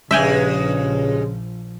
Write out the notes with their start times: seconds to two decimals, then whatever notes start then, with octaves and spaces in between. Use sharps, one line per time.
0.11 A#1 G2 C#3 F3 G#3 E5 G5 G#5